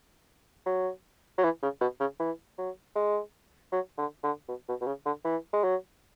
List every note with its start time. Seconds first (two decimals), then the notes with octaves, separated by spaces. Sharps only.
0.66 F#3
1.38 F#3
1.44 E3
1.62 C#3
1.81 B2
2.00 C#3
2.19 E3
2.58 F#3
2.95 G#3
3.72 F#3
3.98 D3
4.23 D3
4.48 B2
4.68 B2
4.81 B2
4.86 C#3
5.05 D3
5.25 E3
5.53 G#3
5.64 F#3